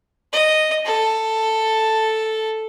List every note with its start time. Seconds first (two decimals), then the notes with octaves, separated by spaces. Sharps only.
0.33 D#5
0.85 A4